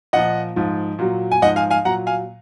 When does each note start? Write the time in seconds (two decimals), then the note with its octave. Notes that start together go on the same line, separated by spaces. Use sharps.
0.13 A#2 F3 D#5 F#5
0.56 G#2 F3
0.99 A#2 F#3
1.32 G#5
1.42 G#2 F3 D#5 F#5
1.56 F5 G#5
1.70 F5 G#5
1.85 A#2 F#3 F#5 A#5
2.07 F5 G#5